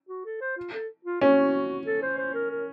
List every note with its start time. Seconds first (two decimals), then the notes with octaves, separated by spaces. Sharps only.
0.09 F#4
0.25 A4
0.41 C5
0.57 F4
0.73 A4
1.05 F4
1.21 C#4 F#4
1.86 A4
2.02 C5
2.18 C5
2.34 A#4
2.51 A#4